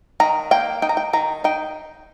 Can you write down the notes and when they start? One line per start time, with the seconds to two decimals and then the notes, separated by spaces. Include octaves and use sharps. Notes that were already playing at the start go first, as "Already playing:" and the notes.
0.20 D#3 A#5
0.51 A#3 G5
0.82 D#4 G5
0.89 A#5
0.97 G5
1.13 D#3 A#5
1.44 D#4 G5